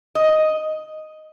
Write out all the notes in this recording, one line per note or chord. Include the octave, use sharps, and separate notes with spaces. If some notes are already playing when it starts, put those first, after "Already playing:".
D#5